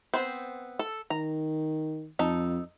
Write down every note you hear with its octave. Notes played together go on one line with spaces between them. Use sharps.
B3 C4 C5
A4
D#3 A#5
F2 D#4 A4